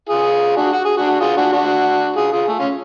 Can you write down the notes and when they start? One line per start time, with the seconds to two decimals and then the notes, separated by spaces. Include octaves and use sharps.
0.09 F4 G#4
0.56 D4 F#4
0.72 F#4
0.85 G#4
0.97 D4 F#4
1.20 F4 G#4
1.37 D4 F#4
1.52 D4 F#4
2.16 F4 G#4
2.32 F4 G#4
2.48 A3
2.59 C#4 F4